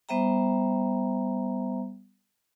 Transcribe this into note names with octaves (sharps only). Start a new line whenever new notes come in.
G3 B3 C5 E5 G5 A#5